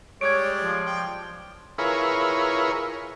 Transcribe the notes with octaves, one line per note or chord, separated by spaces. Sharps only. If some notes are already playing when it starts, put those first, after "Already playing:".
G3 G#3 C#5 D5 G#6 D7
F3
D5 G5
E4 F4 G#4 A#4 B4 C#5